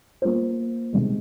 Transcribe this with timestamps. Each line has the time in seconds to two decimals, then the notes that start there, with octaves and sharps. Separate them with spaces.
0.22 A#3 F4 C5
0.93 C3 D#3 G#3